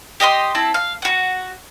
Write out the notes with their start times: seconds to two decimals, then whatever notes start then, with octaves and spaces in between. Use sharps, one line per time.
0.20 G4 D#5 F#5 C6
0.55 C4 E4 A5
0.74 F5
1.02 F#4 F#5